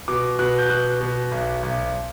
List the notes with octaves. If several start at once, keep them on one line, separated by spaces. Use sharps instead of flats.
B2 D6
B2 F#6
G6
B2 F#6
B2
B1
B1